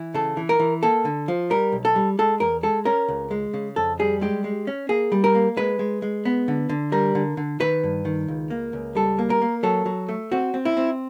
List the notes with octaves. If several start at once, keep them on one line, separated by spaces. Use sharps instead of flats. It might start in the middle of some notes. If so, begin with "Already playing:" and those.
Already playing: E3
C#3 A4
E3
A#4
E3
A#3 A4
D3
F3
G3 A#4
B1
A4
G3
G#3 A4
E2 A#4
G#3 A4
C#4 A#4
C#2
G#3
C#3
F2 A4
G3 G#4
G#3 G4
G#3
C#4
A#3 G#4
G3
A#4
A#3
G#3 B4
G#3
G#3
B3
D3
D3
G3 A#4
D3
D3
D#3 B4
G2
D#3
C#2
A#3
C#2
G3 A4
A#3
A#4
A#3
F#3 A4
F#3
A3
C4 F#4
C4
E4
C4